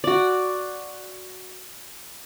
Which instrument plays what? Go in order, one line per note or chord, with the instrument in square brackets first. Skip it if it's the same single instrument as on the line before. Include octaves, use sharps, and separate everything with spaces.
[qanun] F#4 D5